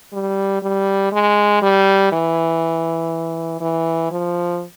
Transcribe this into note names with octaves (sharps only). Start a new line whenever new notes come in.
G3
G3
G#3
G3
E3
E3
F3